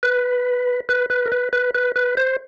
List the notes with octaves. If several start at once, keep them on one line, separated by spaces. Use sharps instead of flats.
B4
B4
B4
A#4
B4
B4
B4
B4
C5